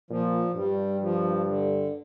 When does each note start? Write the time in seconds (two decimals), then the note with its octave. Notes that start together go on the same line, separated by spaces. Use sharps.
0.10 A#2 F3
0.56 G2 G3
1.01 F3
1.47 D3